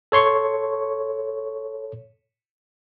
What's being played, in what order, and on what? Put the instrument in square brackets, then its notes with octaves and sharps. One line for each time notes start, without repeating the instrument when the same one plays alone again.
[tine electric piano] A4 C#5 C6 C#6